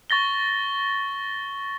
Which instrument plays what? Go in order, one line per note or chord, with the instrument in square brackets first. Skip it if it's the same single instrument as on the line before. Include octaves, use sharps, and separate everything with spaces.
[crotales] C#6 A6 A#6 G7